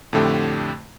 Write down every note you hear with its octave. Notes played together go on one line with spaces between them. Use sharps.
F2 A2 D3 A3 G4